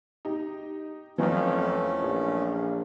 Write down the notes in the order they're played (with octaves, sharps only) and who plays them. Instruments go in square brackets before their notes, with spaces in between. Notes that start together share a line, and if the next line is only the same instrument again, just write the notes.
[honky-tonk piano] D#4 G4
[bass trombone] F2 [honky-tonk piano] E3 F#3 [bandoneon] A3 C#4
[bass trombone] A#1